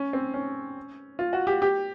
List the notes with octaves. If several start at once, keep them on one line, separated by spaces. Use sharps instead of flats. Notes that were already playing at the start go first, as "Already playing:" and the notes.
Already playing: C#4
C4
C#4
F4
F#4
G4
G4